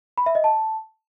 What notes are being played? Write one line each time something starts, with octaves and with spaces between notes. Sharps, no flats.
B5
E5
D#5
A5